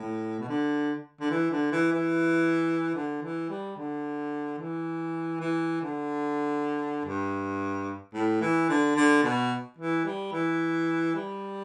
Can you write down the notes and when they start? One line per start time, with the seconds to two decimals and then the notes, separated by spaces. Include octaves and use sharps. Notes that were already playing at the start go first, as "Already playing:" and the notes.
Already playing: A2
0.39 B2
0.48 D3
1.20 D3
1.30 E3
1.51 D3
1.72 E3
1.92 E3
2.94 D3
3.22 E3
3.50 G3
3.76 D3
4.59 E3
5.40 E3
5.81 D3
7.05 G2
8.14 A2
8.41 E3
8.69 D3
8.96 D3
9.23 B2
9.78 E3
10.05 G3
10.32 E3
11.15 G3